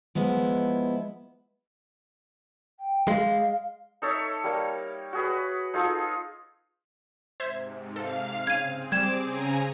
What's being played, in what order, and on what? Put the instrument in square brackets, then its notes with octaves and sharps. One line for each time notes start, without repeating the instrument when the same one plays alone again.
[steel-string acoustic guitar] F3 G#3 B3 E4
[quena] G5
[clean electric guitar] G#3 [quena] F5
[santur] D#4 A4 C#5 E5
G3 A#3 A#4
F#4 G#4 B4
D#4 F4 G#4 A4
[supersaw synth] G#2 C3 [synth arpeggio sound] C5 E5 G#6
[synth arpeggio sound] A4 [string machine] F5
[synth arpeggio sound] C#3 [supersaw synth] C4 G#4 [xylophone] G#6 D#7
[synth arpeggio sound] G3 [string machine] D6 [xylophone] G#6 E7
[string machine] C#3 G#5 A#5